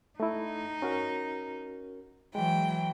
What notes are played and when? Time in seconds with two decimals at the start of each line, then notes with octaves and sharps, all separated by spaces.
0.20 A3 D#4 E4
0.82 C#4 F#4 A#4
2.35 E3 F#3 G#3 G5